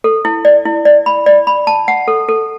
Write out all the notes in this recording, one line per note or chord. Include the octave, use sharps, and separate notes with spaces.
A4
E4
D5
E4
D5
B5
D5
B5
A5
F#5
A4
A4